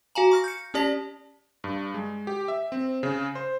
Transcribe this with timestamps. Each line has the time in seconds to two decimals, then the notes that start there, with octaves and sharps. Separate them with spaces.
0.15 F#4 F5 G#5 A#5
0.31 C#6 F6 A#6
0.44 G6 C#7
0.74 C#4 G4 D5 A5 B6
1.64 G2
1.94 G#3
2.27 G4
2.48 E5
2.72 C4
3.03 C#3
3.35 C5